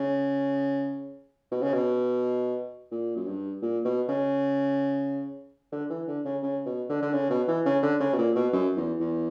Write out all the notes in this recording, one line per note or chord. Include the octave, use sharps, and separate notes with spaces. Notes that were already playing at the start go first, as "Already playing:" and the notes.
Already playing: C#3
B2
C#3
B2
A#2
F#2
G2
A#2
B2
C#3
D3
E3
D3
C#3
C#3
B2
D3
D3
C#3
B2
E3
C#3
D3
C#3
B2
A#2
B2
F#2
E2
E2